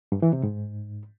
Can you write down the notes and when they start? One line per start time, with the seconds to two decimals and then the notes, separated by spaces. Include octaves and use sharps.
0.12 G2
0.22 E3
0.33 C3
0.43 G#2